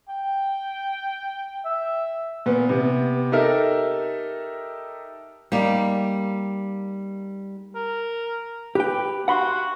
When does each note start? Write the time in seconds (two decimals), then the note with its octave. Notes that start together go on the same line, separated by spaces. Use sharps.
0.09 G5
1.64 E5
2.46 A#2 B3
2.69 C3 B3
3.32 D#4 G4 A4 A#4 E5
5.52 G3 A#3 D#4
7.75 A#4
8.75 G4 B4 G5
9.28 F#4 F#5 B5 C6